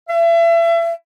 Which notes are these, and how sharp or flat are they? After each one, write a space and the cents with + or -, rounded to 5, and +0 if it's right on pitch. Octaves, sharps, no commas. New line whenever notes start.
E5 +35